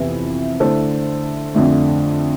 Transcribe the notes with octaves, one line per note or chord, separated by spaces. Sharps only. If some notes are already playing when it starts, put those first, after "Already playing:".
Already playing: F2 C3 E3 B3 E4
D3 A3 E4 A4 C5
F2 D3 A3